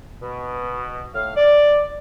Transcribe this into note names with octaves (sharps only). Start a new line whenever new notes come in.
B2
A2 F5
D5